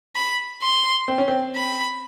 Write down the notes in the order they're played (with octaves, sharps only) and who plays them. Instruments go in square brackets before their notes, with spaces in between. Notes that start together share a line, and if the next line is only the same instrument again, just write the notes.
[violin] B5
C6
[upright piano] C4
C#4
C4
[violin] B5